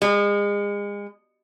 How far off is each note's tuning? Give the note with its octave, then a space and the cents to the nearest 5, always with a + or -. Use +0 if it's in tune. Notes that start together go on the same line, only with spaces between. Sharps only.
G#3 -35